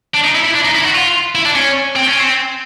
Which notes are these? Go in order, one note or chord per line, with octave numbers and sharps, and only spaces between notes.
D4
D#4
E4
E4
D4
D#4
E4
F#4
F4
E4
D4
C#4
C4
C#4
C4